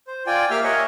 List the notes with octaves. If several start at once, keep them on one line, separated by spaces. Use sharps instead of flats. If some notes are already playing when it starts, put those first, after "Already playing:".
C5
F4 D5 G5 G#5
A#3 G4 E5 F5 F6
A#4 C#5 D#5 E5 F#5 G#5